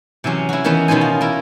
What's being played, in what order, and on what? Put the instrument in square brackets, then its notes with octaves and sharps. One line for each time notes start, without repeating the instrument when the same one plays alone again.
[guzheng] C3 E3 F#3 C#4
E4 F#4
D#3 E3 B3 C#4 D#4 E4
B2 D#3 C#4 C5 G#5
F4
E4 A#4